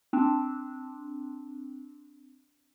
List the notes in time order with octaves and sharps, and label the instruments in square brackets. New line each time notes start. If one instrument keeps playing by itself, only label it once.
[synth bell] C4 D4